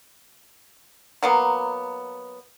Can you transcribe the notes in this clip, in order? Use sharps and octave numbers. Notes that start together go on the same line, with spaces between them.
F#3 A#3 B3